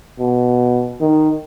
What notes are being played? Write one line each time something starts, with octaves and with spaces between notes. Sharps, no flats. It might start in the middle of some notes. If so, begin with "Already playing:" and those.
B2
D#3